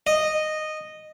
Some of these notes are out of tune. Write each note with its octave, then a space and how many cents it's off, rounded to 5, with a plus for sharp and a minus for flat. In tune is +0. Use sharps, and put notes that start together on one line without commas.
D#5 -10